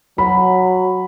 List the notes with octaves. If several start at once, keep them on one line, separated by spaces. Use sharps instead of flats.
F#3 B5